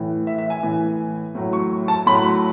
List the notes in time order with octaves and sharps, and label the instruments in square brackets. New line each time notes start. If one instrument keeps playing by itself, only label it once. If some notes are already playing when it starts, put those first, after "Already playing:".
Already playing: [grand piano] A2 E3
E5
E5
G#5
A2 E3
A2 F#3
C#6
A5
A2 F#3 B5